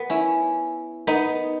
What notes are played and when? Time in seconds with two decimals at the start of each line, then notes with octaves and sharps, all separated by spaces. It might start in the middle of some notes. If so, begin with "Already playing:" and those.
Already playing: B3
0.10 C#4 E4
1.07 B3 D#4